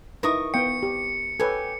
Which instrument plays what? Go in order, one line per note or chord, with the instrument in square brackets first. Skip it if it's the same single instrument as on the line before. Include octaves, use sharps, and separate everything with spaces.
[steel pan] D#4 E4 B4 [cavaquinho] A#4 C#6 D#6
[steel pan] B3 F5 G5 [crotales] C#7
[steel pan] G4
[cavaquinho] G4 G#5 [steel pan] A4 B4 C#5